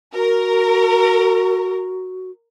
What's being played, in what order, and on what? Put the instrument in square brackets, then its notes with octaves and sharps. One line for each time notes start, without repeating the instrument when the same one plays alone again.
[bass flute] F#4 [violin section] A#4